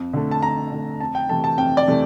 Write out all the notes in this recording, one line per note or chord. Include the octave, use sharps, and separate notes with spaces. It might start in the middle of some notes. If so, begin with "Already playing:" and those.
Already playing: F2
D3 A3
A5
F2 A#5
D3 A3
F2 A5
G5
C3 E3 A3 A5
A5
F2 G5
D5
C3 E3 A3